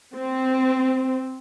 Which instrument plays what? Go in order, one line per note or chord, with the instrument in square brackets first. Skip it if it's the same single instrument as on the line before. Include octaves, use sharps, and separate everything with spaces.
[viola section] C4